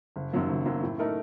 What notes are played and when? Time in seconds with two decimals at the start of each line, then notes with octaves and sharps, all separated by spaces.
0.16 F#1
0.32 F#2 D#3 F#3 A#3
0.49 F#1
0.65 F#2 D#3 F#3 A#3
0.83 A2
0.99 A3 D#4 A#4